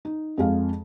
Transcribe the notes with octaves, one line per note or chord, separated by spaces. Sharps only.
D#4
F2 G#3 F5